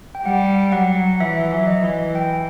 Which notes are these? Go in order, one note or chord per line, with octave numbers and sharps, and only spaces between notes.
G5
G3 F#5
F#3 F#5
E3 E5
F#3
D#5
E3
G5